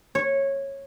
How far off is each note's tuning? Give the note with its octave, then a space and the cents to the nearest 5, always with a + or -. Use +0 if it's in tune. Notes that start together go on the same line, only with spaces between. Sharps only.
C#5 -15